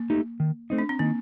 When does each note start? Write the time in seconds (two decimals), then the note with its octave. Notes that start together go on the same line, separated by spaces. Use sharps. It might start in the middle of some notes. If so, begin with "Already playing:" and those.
Already playing: A#3
0.10 A3 D#4 G4
0.40 D#3
0.70 A3 C4 D#4
0.78 D4
0.89 C4
0.99 D#3 A#3